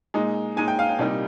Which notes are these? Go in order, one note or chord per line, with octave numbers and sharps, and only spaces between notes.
A#2 G#3 D#4
A#2 G#3 D#4 G#5
G5
F5
G5
C2 A#2 G3 A#3 D#4